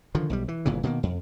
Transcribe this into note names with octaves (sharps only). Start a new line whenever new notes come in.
D3 D#3 F3
B1 F3 G3
E3
G1 A#2 C#3 E3
B2 D#3 G#3 A#3
F2